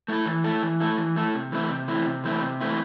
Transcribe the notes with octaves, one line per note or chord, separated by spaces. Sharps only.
A3 E4 A4
E3
A3 E4 A4
E3
A3 E4 A4
E3
A3 E4 A4
C3
E3 A3 C4 E4
C3
E3 A3 C4 E4
C3
E3 A3 C4 E4
C3
E3 A3 C4 E4